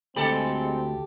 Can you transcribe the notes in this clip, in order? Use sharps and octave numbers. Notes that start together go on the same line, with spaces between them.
D2 G#3 C4 G4 A4 B5